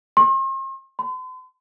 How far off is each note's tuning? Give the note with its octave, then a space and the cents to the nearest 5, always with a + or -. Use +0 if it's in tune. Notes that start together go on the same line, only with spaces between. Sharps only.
C6 +45
C6 -45